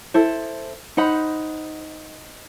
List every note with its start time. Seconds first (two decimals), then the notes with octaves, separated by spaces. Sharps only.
0.14 E4 A4 C5
0.97 D#4 C5 F#5 B5